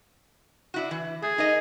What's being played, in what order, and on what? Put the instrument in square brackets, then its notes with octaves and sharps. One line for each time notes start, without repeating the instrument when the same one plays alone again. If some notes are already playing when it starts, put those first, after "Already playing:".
[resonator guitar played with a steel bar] D4 E4 F#4
E3
[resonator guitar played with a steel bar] A3 [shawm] G#4
[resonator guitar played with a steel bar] D#4 A#4 D#5